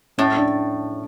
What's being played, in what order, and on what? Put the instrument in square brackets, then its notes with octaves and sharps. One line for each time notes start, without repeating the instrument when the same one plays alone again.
[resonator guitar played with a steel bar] A2 [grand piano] C#4
[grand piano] D4